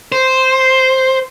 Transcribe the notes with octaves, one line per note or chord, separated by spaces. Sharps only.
C5